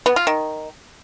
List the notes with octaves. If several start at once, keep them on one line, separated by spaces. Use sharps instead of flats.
B3
F4
D#3